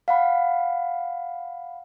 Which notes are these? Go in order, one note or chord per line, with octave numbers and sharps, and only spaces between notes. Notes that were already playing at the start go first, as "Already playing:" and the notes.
F5 F#5 B5